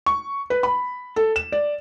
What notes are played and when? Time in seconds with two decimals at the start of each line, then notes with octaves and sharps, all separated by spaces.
0.06 C#6
0.50 B4
0.63 B5
1.16 A4
1.36 E7
1.52 D5